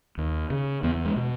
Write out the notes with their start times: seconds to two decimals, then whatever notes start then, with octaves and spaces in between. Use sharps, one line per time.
0.18 D#2
0.50 C#3
0.83 E2 B3
1.05 G#3
1.16 B2